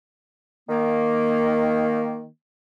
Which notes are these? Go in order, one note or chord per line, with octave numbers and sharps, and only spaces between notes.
D#3 A#3